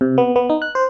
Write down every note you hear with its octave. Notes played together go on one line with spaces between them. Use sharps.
C3
B3
B3
D#4
F#6
C5